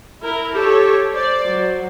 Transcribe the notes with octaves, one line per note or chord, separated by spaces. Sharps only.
E4 A#4
G4 A4 C#5
C5 D5
F#3